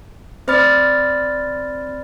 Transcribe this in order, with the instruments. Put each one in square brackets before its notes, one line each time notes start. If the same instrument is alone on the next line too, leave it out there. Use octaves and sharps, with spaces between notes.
[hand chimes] C4 C5 D5 B5 F6 A6